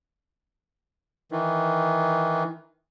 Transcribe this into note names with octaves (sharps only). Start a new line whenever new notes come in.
D#3 E3